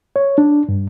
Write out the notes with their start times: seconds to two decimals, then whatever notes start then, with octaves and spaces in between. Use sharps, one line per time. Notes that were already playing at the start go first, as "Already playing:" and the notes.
0.16 C#5
0.38 D4
0.69 G2